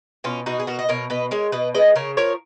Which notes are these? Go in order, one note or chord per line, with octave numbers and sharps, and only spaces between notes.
B2 C#4 F4
B2 D#4 F#4
G#4
B2 F#4 A#4
D#5
B2 A#4 C#5
B2 B4 D#5
G#3 A#4 C#5
B2 B4 D#5
G#3 B4 D#5
C#3 A#4 C#5
F3 A#4 C#5